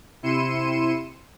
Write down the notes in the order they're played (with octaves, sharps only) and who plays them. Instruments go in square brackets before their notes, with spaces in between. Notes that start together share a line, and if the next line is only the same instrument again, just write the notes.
[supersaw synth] C3 E4 C6 C#7 D#7 E7